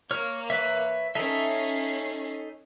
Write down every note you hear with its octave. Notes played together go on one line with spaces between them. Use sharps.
A#3 C#5 F6
B4 C#5 E5
C#4 D#4 A4 E5 C7